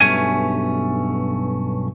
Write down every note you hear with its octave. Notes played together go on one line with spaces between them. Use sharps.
B1 G2 A3 C#4 G#5